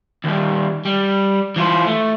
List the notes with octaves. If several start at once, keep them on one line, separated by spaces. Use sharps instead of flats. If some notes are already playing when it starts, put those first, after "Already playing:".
D#2 G3
G3
E3 F4
A3